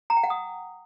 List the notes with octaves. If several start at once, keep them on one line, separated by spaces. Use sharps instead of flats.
A#5
G5
F#5
D#6